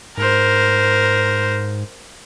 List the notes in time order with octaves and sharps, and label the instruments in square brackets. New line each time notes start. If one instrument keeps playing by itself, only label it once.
[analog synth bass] G#2 [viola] A#4 C5